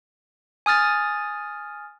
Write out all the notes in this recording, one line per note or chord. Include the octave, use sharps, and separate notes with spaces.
G#5 D#6 F6 A6